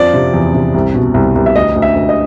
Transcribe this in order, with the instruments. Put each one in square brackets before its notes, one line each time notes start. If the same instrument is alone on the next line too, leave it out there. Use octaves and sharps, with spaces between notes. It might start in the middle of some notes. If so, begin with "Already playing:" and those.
Already playing: [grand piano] F2 F3 D5
C3
E2
C3
C2
B2
C2
C2
E5
D2 D#5
D2
E5
D2
D#5